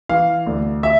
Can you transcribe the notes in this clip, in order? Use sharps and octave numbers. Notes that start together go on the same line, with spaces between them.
E3 F5
D2
E5